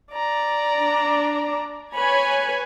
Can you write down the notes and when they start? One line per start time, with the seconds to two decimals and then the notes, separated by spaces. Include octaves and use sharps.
0.13 D5 A#5
0.79 D4
1.94 B4 C#5 G#5 B5